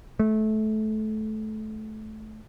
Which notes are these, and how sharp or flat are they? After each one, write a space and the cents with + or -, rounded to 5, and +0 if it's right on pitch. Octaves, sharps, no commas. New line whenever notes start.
A3 -20